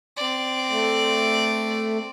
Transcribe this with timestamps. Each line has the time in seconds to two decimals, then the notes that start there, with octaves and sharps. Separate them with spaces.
0.17 C4 D5
0.70 A3